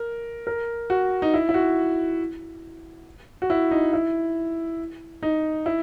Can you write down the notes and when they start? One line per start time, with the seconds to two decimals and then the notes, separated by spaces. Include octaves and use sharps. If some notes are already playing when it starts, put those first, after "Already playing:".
Already playing: A#4
0.47 A#4
0.90 F#4
1.22 D#4
1.34 E4
1.49 E4
1.54 F#4
3.42 F#4
3.50 E4
3.71 D#4
3.93 E4
5.23 D#4
5.66 E4